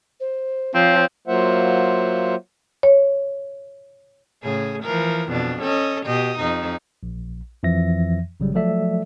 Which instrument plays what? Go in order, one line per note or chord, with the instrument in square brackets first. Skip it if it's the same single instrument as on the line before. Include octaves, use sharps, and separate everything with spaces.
[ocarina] C5
[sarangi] F3 [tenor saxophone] C4 [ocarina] C#5
[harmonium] F#3 A#3 F4 C5 E5 F#5
[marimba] C#5
[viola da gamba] A2 C#3 G#4
E3 F3 A#4
F2 B2 D4
C#4 A4 D#5
B2 G4 D#5
F2 D#4
[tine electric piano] A#1
F2 E3 F3 E5 A#6
G#1 C#3 F#3 G3
F3 F#3 A3 A4 D5 E5